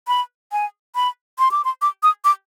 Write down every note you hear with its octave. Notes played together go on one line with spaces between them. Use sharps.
B5
G#5
B5
C6
D6
C6
D6
D#6
D6